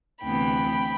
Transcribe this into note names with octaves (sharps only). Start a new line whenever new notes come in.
D2 C3 E3 B3 G5 B5